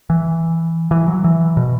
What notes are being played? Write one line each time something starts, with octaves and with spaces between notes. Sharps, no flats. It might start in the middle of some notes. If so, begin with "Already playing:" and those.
E3
E3
F#3
E3
B2